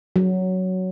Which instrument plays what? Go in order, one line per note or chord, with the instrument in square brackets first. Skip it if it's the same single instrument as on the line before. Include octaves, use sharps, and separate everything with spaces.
[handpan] F#3